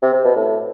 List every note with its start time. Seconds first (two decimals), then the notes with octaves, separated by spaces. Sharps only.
0.02 C3
0.13 C3
0.25 B2
0.36 A2